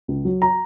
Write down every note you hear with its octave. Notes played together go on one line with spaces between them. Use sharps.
C#2
F#3
A#5